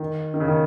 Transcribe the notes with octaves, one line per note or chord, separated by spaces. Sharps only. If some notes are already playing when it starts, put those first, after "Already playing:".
Already playing: D#3
D#3
C#3
D#3